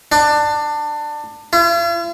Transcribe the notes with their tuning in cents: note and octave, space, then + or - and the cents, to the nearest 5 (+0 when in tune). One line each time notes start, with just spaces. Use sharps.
D4 +20
F4 -45